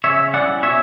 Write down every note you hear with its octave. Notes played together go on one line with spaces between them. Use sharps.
C#3 C#5 E5
G3 C#4 E4 D5 F#5
B2 C#5 E5